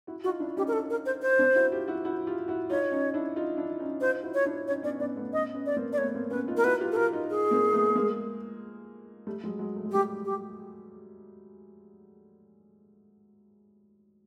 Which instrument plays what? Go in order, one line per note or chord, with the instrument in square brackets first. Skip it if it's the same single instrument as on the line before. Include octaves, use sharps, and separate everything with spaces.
[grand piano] E4 F#4
[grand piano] D#4 F4 [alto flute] F#4
[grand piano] D4 E4
[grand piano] C#4 D#4 [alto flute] G4
[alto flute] A#4
A4
A#4
C5
C5
[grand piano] C4 D4
E4 F#4
F4 G4
E4 F#4
E4 F#4
F4 G4
E4 F#4
[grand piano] D#4 F4 [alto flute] C#5
[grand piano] C#4 D#4
D4 E4
D#4 F4
D4 E4
E4
C#4 D#4
[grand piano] D#4 F4 [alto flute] C5
[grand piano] E4 F#4
[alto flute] C#5
[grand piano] D4 E4
[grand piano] C#4 D#4 [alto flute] C#5
[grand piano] B3 C#4 [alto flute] D5
[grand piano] B3 C#4 [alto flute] D5
[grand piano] A3 B3
[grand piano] B3 C#4 [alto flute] D#5
[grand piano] B3 C#4
[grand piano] B3 [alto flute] D5
[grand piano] A#3 C4
[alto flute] D5
[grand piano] A3 B3 [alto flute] C#5
[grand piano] A#3 C4
[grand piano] B3 C#4 [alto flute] B4
[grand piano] D#4 F4
[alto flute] A#4
[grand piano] E4 F#4 [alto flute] B4
[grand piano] F4 G4
[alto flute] A4
[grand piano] F4 G4 [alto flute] A#4
[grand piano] D#4 F4
[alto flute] G#4
[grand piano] A#3 C4
A3 B3
G#3 A#3
G3 A3
F#3 G#3
F#3 G#3
A3
G#3
[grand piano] G3 A3 [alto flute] G4
[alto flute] G4